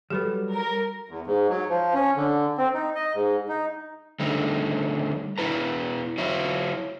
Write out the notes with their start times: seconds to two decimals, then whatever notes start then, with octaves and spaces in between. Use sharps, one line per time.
0.10 F#3 G3 G4 A4 B4
0.52 A#4
1.09 E2
1.27 G#2
1.49 F#3
1.69 F3
1.94 C#4
2.16 D3
2.58 C4
2.74 D#4
2.95 D#5
3.14 G#2
3.48 D#4
4.20 D3 G3 A3 D#4
5.38 B2 F3 E4 B4 A#5
6.18 F#3 E4 F4 E5